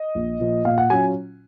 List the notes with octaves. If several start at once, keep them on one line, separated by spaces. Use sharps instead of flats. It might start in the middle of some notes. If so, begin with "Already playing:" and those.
Already playing: D#5
A#1
A#2 F3
A#2 F5
F#5
F#3 C#4 F4 G#5